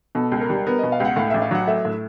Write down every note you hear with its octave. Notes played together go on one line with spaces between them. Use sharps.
B2 A4
C#2
A#4
G3
B3 A#4
B2 D#5
F5
C#2 F#5
A2 F5
A1 E5
F5
F#3 F#5
A3 E5
A2